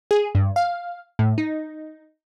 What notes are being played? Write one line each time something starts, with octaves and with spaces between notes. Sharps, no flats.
G#4
G2
F5
A2
D#4